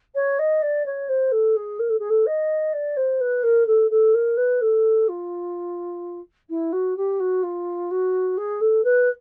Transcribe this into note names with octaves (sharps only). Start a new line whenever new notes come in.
C#5
D#5
D5
C#5
C5
A4
G#4
A#4
A4
G#4
A4
D#5
D5
C5
B4
A#4
A4
A4
A#4
B4
A4
F4
E4
F#4
G4
F#4
F4
F#4
G#4
A4
B4